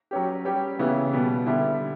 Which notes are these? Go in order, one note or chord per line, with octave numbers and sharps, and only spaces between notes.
F#3 C#4 G4
G3 C#4 G4
C#3 E3 B3 E4
B2 G3 B3
D3 G3 B3 E4